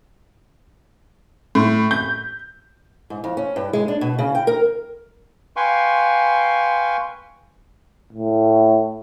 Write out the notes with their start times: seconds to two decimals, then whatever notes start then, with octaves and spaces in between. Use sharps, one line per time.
1.55 A2
1.91 G6
3.10 G#2
3.24 F2
3.37 C#4
3.56 G2
3.73 G#3
3.88 D4
4.01 B2
4.19 C#3
4.35 G5
4.47 A#4
5.56 B4 F5 G5 G#5 C6 C#6
8.12 A2